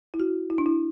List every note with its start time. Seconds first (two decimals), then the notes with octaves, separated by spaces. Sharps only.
0.14 E4
0.20 F#4
0.50 E4
0.58 D4
0.66 E4